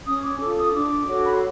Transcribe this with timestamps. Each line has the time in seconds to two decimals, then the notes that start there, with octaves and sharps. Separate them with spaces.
0.06 C#4 D#6
0.23 D6
0.40 F4 A4 D6
0.57 D#6
0.74 D4 D6
1.07 F#4 A4 C#5
1.24 B5
1.33 C6